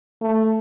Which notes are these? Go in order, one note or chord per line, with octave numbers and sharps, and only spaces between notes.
A3